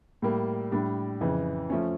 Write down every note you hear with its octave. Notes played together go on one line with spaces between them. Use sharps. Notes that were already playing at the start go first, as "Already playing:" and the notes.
A2 G3 A#3
A2 G3 D4
F2 C#3 E3
F3 A3 C#4